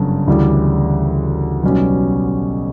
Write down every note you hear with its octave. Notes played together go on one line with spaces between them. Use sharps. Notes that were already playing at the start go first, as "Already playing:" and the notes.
Already playing: G1 F#2 C#3 D4
D2 C#3 E3 G3
B1 B2 G3 C#4